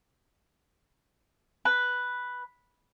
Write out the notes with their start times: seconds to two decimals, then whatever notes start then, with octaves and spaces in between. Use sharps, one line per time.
1.65 B4